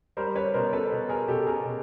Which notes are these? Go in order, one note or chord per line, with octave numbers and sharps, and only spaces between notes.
G3 A#4 C5
B4 C#5
B2 A#4 C5
A4 B4
B2
G#4 A#4
B2 G4 A4
G#4 A#4
B2